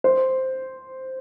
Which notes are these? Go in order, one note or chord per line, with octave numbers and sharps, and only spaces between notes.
C5